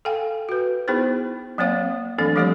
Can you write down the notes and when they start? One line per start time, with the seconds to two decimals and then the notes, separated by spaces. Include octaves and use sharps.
0.05 A4 F5 G5 G#5
0.49 F#4 B4
0.88 B3 D#4 E4 G#4 C5
1.58 F#3 A#3 C4 C#5 F5
2.18 E3 F#3 A3 C4 D4 A4
2.36 F3 G3 A3 G4 A4 C#5